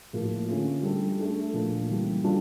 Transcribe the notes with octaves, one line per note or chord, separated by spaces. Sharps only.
A2 F3 A#3
D3 A3 C#4 F4
G3 D4 A4
A3 D4 A4
A#2 F3 A3 D4
C#3 E3 G3 A#3
G3 D4 F4 A4